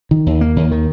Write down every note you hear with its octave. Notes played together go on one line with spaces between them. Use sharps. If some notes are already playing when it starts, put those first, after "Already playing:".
D#3
D#2
A#3
D#2
D#3